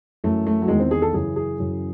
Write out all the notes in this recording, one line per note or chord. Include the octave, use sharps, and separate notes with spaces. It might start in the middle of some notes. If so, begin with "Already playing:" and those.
F#2 E3 A3
A3
F#3
E2 D#3 G#3
C4
G#4
A4
F#2 C#3 E3 G#4
G#4
F#2 C#3 E3